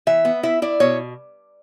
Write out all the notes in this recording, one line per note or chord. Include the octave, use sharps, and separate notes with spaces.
E3 E5
B3
E4 E5
E4 D5
B2 C#5